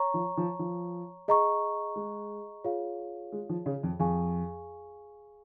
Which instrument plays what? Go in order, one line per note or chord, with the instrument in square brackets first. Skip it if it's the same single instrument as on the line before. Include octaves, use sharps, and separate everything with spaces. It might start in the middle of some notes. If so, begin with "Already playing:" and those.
Already playing: [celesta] C#5 A#5 C#6
[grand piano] F3
F3
F3
[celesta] G#4 D#5 A#5 C#6
[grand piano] G#3
[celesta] F4 G#4 C#5 F5
[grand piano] G#3
F3
C#3
F2
[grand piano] F2 [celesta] G#4 F5 G#5 C#6